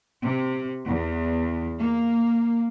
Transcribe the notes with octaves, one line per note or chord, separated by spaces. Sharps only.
C3
E2
A#3